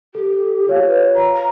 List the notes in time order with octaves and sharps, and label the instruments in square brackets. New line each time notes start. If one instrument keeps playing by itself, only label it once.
[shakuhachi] G4 [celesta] A4
[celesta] F4 C#5 F5
[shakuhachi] B4
A#5
A#5